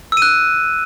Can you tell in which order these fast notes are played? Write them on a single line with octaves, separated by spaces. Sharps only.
E6 D#7 F#6